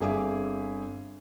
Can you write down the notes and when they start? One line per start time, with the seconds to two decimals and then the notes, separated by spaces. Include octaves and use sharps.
0.01 G1 C4 G#4 E5 F5 D6